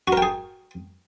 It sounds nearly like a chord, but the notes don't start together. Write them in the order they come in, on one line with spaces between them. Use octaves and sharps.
F#4 A#4 G5 G#4